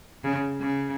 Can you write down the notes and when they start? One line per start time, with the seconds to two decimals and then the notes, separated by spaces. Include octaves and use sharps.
0.24 C#3
0.60 C#3